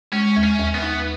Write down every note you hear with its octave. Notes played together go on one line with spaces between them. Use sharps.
G#3 C#4
D#2
C#4
D#2
B3
D#4